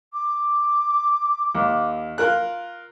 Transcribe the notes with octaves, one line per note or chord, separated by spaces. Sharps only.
D6
D#2
F4 A#4 F#6